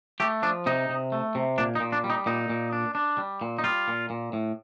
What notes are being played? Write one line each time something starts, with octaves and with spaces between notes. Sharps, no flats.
A3 G4
F3 D4
C3 D#4
C3
A3
C3
A#2 D4
D#4
A#2
D4
G3
D#4
A#2 D#4
A#2
D4
D4
G3
A#2
D#4
G3 F4
A#2
A#2
A2